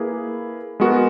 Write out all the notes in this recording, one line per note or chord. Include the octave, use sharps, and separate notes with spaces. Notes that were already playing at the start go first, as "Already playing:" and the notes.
Already playing: A#3 E4 G#4 B4
G#3 B3 F#4 A#4